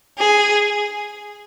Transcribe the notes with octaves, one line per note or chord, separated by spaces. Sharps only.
G#4